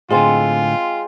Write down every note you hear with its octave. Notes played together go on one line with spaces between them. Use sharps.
A2 D3 G#3 C4 F4 G#5 C6 D#6